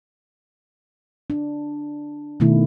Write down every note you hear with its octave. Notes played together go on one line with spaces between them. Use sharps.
D4
B2 D#3 A3 E4